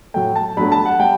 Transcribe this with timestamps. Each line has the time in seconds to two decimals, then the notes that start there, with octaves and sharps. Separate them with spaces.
0.14 A2 F#3 A3 G5
0.36 A5
0.57 G2 F#3 A3 B5
0.72 A5
0.85 F#5
0.99 G3 G5